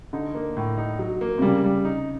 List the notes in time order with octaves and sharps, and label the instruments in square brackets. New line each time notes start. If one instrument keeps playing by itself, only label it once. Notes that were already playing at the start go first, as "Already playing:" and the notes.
[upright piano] D3 [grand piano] D#4
[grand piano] A#3
A2
D#4
F#3
A#3
[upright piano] C3
[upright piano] C#3 [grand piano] G3
[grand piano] G3
D#4